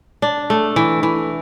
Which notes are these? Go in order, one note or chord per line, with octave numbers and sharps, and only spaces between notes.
D4
A3
E3
E3